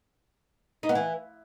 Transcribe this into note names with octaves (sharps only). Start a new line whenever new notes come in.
D#4
B3
E3